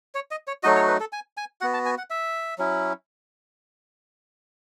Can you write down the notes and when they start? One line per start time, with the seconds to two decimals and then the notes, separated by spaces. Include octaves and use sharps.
0.15 C#5
0.31 D#5
0.47 C#5
0.63 F#3 A3 D#4 F#4 D#5
0.76 C#5
0.88 B4
1.00 A4
1.12 G#5
1.37 G#5
1.61 B3 F#4 F#5
1.74 A5
1.86 G#5
1.98 F#5
2.10 E5
2.58 F#3 C#4 E4